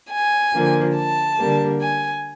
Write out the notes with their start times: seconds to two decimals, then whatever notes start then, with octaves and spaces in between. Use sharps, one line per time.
0.10 G#5
0.53 D3 F3 A#3
0.95 A5
1.38 D3 G3 A#3
1.80 G#5